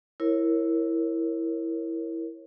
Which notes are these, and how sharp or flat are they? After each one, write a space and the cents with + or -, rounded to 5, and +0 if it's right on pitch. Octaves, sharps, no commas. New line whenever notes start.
E4 +0 A#4 +0 C#5 -25